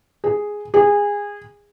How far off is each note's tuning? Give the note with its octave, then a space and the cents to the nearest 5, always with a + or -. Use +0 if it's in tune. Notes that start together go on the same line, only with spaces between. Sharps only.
G#4 +0
G#4 -20